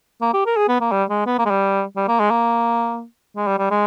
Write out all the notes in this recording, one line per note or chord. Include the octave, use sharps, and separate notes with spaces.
A#3
G4
A#4
G#4
B3
A#3
G3
G#3
B3
A#3
G#3
G3
G3
A#3
G#3
A#3
G#3
G3
G3
G#3